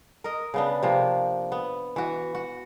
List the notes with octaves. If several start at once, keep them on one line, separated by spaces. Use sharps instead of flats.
A#4 D#5
C#3 B3 D4
C3 F3 A#3
B3
E3 F#4
F#4